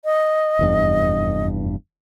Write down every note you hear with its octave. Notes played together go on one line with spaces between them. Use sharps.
D#5
F1 E2 G2